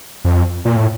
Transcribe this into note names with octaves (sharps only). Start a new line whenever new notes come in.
F2
A#2
A2